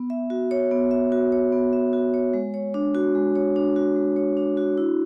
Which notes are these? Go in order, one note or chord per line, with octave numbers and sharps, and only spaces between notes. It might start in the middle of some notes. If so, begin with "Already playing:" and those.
Already playing: B3
E5
F#4
C#5
B3
E5
F#4
C#5
B3
E5
F#4
C#5
G#3
C#5
D4
F#4
G#3
C#5
D4
F#4
G#3
C#5
D4
F#4
E4